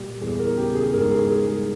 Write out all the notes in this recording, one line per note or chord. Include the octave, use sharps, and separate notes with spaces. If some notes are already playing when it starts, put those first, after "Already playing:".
Already playing: A#2 G3
E2 G#4
A#4
C#3 G4
G#4
G#2 A#4
A#4
G#4
G3 A#4
G#4